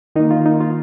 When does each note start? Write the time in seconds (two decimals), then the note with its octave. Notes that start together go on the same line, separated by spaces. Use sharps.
0.15 D#3 A#3 D#4
0.31 F4
0.46 D#4
0.60 F4